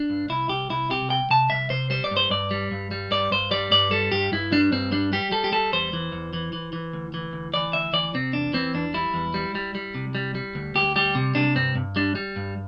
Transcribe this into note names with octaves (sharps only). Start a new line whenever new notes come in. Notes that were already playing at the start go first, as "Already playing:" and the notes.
Already playing: D4
G2
C2 E4
C2 G4
C2 E4
C3 G4
C2 G5
C3 A5
C2 E5
C3 C5
G3 C5
D5
G2
C5
G2 D5
G3
G2
G3
G2 D5
G2 C5
G3 D5
G2 D5
G3 A4
G2 G4
G2 E4
G3 D4
G2 C4
G3 D4
G3 G4
G3 A4
G4
G3 A4
E2 C5
E3
E2
E3
E3
E3
D2
E3
D2
E3 D5
D2 E5
E3 D5
C3 C4
E2 D4
E3 C4
E2 D4
G3 E4
E2
G3
G3
G3
C3
G3
G3
D2
D2 G4
G3 G4
C3
C3 D4
G2 C4
G2
G3 D4
G3
G2